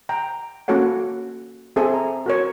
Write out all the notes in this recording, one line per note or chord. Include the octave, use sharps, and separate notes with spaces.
G5 A#5
A#3 C#4 F#4 A4 C#5 F#5
C4 G#4 A4 E5 G#5
A#5
F#4 A#4 C#5